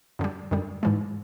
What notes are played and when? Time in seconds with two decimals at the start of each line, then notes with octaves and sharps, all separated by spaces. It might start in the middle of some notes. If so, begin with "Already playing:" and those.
0.19 F#2 D3 G3
0.51 F#2 D3 G3
0.83 G#2 E3 G#3